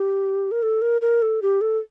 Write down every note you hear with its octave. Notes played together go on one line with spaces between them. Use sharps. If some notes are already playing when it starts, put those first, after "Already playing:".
Already playing: G4
A#4
A4
A#4
A#4
A4
G4
A4